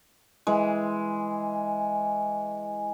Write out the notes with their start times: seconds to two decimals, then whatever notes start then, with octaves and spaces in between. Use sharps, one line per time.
0.47 E3 G#3